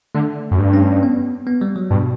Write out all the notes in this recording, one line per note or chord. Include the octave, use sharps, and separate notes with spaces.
D3 A3
F#2
G2
C#4
B3
B3
G3
F#3
G2 B2